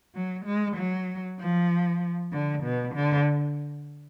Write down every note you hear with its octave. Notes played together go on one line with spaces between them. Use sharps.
F#3
G#3
F#3
F3
D3
B2
D3